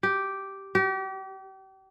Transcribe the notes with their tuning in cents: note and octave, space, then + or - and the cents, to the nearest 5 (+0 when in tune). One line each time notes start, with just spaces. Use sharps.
G4 -5
G4 -35